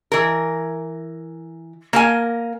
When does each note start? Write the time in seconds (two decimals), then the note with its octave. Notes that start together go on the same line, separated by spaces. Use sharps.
0.12 E3 A#4
1.93 A#3 A#4 G#5